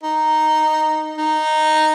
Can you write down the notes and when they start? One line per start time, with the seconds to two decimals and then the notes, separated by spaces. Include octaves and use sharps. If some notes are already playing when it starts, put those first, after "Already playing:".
0.03 D#4
1.18 D#4